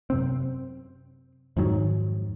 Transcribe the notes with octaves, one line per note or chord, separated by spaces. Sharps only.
F#2 C3 C4
F2 G#2 D#3 F#3